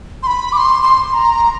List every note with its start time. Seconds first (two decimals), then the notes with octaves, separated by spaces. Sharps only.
0.23 C6
0.27 B5
0.52 D6
0.57 C6
0.83 C6
1.14 A#5
1.43 A#5